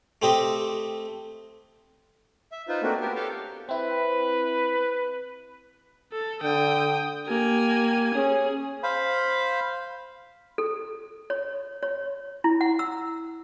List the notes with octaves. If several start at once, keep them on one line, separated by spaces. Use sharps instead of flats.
A3 C4 G4 D#5 E5
E5
D#4 F4 B4 C5
A3 A#3 C4 D4 F#4
B3 F#4 G4 A#4 B4
G4 A4 C#5 F5 G5 A5
C4 E4 B4
A4
D3 G5 D#6
A#3 G4 G#5
C#4 G#4
C5 F5 B5
A4
C#5
C#5
E4
F#5
E6